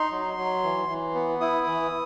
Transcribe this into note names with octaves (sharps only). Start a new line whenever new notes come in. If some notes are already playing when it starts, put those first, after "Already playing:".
Already playing: D#4 C6
F#3
F#3
E3
E3
B3
E4 D#6
E3